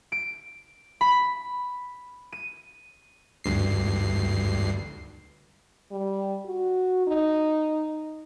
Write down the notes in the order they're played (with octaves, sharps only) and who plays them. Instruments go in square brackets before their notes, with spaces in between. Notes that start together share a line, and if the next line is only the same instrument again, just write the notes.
[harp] D7
B5
D#7
[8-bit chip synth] D2 G2 C7
[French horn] G3
F#4
D#4